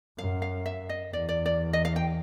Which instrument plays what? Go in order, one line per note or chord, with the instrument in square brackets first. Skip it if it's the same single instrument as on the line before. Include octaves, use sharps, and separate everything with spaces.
[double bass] F#2 [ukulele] F5
[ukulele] F5
E5
D#5
[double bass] E2 [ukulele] D5
[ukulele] D5
D5
D#5
F5
G5